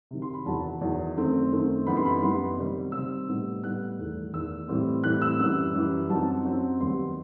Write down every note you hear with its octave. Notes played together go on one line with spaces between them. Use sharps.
C3 D#3 F#3
C6
B5
E2 D#3 F#3 A5
E2 D#3 F#3
F#2 D#3 A3 C4
F#2 D#3 A3 C4
F#2 E3 G3 B3 D#4 B5
C6
B5
F#2 E3 G3 B3 D#4 C6
C3 D#3 G3 C4
C3 D#3 G3 C4 E6
A2 G3 B3 D#4
A2 G3 B3 D#4 F#6
E2 D#3 A3
E2 D#3 A3 E6
A2 E3 G3 C4
A2 E3 G3 C4 F#6
E6
F#2 E3 G3 E6
F#2 E3 G3
F#2 F#3 C4 D#4 A5
F#2 F#3 C4 D#4
D#2 D#3 G3 B3 D#4 C6